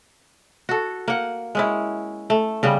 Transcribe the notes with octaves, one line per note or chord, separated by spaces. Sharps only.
F#4 A4
A#3 F#5
G#3 C#4 E4
A3
C#3 G3 B3